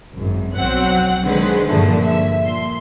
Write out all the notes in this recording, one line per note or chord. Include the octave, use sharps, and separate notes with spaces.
G#1 F#2
B1 F#3 C4 F#5 F#6
D3 D#3 F#3 G#3 B4 C5
G2 A#2 D3 F3 G#3 A3
E5
A#2 C6